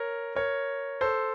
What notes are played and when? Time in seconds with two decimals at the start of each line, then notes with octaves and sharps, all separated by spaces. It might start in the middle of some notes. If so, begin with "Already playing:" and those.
Already playing: A#4 C#5
0.35 A#4 C#5
1.01 A4 C5